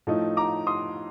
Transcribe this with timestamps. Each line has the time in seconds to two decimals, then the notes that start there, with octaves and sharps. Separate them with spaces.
0.07 A2 F3 A3 D#4
0.37 A#5 D6
0.67 C6 D#6